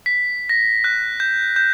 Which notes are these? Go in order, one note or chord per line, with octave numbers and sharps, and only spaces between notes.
B6
A#6
F#6
G6
G6